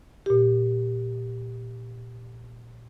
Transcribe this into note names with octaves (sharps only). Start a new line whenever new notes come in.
A#2 G4